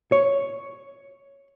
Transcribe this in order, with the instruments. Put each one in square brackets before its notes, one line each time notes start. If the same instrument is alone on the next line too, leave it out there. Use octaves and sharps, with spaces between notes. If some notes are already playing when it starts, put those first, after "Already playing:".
[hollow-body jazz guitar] C#5